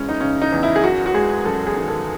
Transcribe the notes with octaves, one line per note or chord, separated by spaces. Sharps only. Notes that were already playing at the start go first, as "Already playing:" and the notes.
Already playing: E2 G#3 C#4 E4
D#4
C#3 C#4
D#4
E2
E4
G#4
F#2 F#4
F#4
G#3 G#4
F#2 A4
G#4
D#3
A4